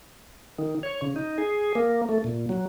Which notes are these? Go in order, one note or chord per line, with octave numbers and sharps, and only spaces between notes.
D#3
C#5
C#3
D#4
G#4
A#3
A3
A#2
F#3